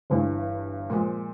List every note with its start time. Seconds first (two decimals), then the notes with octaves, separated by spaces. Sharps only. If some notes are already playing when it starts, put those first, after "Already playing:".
0.10 G1 G2 E3
0.90 A#2 F3 G#3